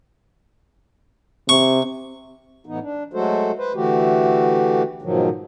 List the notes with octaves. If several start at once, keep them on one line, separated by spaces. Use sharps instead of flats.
C3 C#6
A2 E3 B3 D#4
D4
F#3 G#3 A3 F#4 A4 C5
B4 C5
D3 E3 A3 F#4 G4
G#2 B2 D#3 F3 F#3